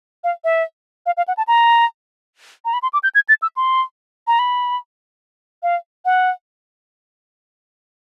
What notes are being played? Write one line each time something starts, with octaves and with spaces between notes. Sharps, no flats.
F5
E5
F5
F5
F#5
A5
A#5
A#5
B5
C6
D6
G6
G#6
A6
E6
C6
A#5
B5
F5
F#5